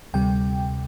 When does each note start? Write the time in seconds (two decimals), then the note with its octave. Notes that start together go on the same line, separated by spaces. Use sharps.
0.14 D2 C3 G3 G5